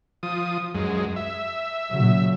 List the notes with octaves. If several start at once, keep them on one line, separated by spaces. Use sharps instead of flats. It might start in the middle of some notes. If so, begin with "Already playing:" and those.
F3 D#6
F#2 G#3
E5
A#2 C#3 F#3